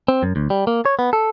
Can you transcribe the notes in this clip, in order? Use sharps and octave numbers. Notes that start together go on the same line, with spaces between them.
C4
F#2
D2
G3
A#3
C#5
B3
A4